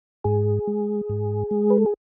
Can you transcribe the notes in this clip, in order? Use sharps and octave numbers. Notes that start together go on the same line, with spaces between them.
G#2 G#4
G#3
G#2
G#3
B4
A4
G#4